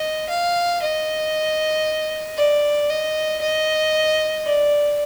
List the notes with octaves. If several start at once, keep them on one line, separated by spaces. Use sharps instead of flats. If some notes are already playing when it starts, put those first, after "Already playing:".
Already playing: D#5
F5
D#5
D5
D#5
D#5
D5